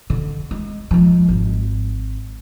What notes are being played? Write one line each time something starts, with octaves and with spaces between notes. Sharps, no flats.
D3
G#3
F3 G#3
G#1